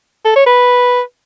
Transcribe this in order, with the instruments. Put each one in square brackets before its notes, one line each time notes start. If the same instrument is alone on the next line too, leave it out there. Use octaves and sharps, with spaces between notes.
[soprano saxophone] A4
C#5
B4